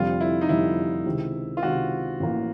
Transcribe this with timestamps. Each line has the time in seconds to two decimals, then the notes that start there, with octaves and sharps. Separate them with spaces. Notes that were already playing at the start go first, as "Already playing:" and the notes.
Already playing: F1 F2 D3 G3 F4
0.20 E4
0.41 D#4
0.49 F1 F2 D3 G3 E4
1.06 C#2 C3 D#3
1.57 F4
1.63 C#2 C3 D#3 F#4
2.20 A1 A2 F3 A#3